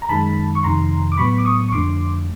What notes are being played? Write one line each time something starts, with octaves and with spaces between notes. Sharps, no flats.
A#5
F#2 D#3 G#3 A5 B5
C#6
F2 C3 D#3 A#5 C6
D6
A2 F#3 B3 B5 C#6
D6
C#6 D#6
C#6
F2 D3 F3 A3 C6 D6